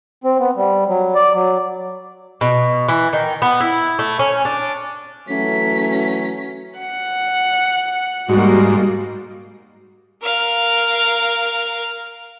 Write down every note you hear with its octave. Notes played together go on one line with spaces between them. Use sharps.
C4
B3
G3
F#3
D5
F#3
B2
E3
D#3
B3
E4
A3
C#4
D4
E3 F#3 A3 C#4 B6
F#5
G#2 G3 G#3 A#3 F#4
A#4 F5